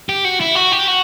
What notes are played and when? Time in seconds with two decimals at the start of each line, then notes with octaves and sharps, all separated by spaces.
0.09 G4
0.25 F#4
0.41 E4
0.56 F#4
0.72 G4
0.88 F#4